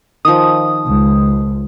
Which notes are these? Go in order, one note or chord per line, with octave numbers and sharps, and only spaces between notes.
D#3 F3 D#6
C#2